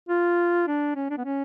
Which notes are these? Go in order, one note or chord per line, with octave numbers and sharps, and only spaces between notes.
F4
D4
C#4
D4
B3
C#4